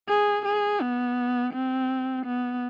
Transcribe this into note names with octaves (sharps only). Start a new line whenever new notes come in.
G#4
G#4
B3
C4
B3